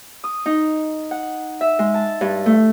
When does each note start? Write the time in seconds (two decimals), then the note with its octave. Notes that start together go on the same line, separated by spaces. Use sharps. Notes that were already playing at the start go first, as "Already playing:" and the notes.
0.24 D#6
0.46 D#4
1.11 F#5
1.61 E5
1.79 G#3
1.94 A5
2.21 G2
2.46 A3